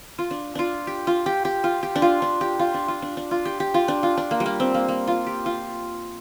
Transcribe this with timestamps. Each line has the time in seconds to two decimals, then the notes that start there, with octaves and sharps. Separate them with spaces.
0.19 F4
0.31 D4
0.55 D4 F4
0.87 G4
1.07 F4
1.26 G4
1.45 G4
1.64 F4
1.83 G4
1.96 D4
2.02 F4
2.22 D4
2.41 G4
2.59 F4
2.74 D4
2.88 F4
3.02 D4
3.17 D4
3.31 F4
3.45 G4
3.60 G4
3.74 F4
3.88 D4
4.03 F4
4.17 D4
4.31 A#3
4.40 G3
4.46 A#3
4.60 C4
4.74 A#3
4.88 A#3
5.07 F4
5.26 G4
5.46 F4